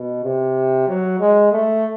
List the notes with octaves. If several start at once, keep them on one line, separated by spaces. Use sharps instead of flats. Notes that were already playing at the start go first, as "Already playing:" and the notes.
Already playing: B2
C3
F#3
G#3
A3